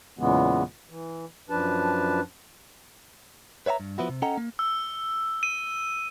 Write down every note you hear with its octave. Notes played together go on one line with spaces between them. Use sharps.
E2 A#2 C#3 E3 G#3 B3
E3
F#2 F3 D4 B4 A5
B4 C#5 E5 F5 A#5
G2
F3 B3 E4 F#4
C3
C#4 A4 D#5 F#5 G5 A#5
A#3
E6
D#7